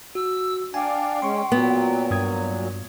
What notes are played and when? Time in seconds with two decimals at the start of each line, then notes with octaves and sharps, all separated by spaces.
0.15 F#4 E6
0.74 D4 D5 F5 G5 G#5
1.22 G#3 C#4 C6 C#6
1.52 A#2 F#3 B3
2.11 G2 D#6 G#6